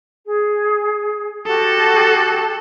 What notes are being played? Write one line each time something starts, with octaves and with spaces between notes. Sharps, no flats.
G#4
F#4 G4 A4